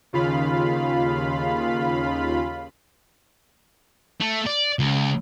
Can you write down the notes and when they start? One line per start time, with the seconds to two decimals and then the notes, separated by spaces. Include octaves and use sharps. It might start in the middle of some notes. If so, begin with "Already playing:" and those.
0.13 D#2 C#3 F4 F5 B5
4.20 A3
4.46 D5
4.79 C#2